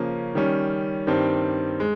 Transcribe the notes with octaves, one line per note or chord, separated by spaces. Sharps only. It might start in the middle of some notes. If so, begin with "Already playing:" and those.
Already playing: C#3 F3 A#3 C#4
D#3 G3 C#4
G2 D#3 G3 C4
G#3